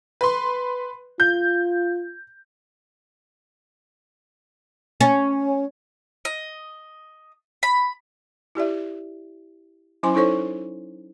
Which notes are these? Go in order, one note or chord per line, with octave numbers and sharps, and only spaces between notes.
B4 C6
F4 G6
C#4
D#5
B5
E4 G4 D5 E5
F#3 C#4 E4 C5 G#5 C6
D#4 E4 A4 C5 C#5 C#6